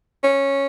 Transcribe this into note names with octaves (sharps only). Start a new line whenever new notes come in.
C#4